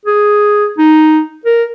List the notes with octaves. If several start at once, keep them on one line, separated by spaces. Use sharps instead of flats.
G#4
D#4
A#4